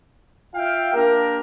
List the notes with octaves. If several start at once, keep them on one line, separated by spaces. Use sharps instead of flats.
F4 E5 F5 G5
A#3 D4 G4 A#4